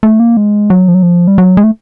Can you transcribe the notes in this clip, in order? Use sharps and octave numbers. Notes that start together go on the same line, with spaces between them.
A3
A#3
G#3
F#3
F3
F#3
F3
G3
F#3
G#3
A3